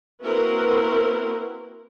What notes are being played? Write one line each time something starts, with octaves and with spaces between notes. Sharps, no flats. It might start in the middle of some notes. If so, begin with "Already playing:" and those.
A#3 C4 E4 F#4 A#4 B4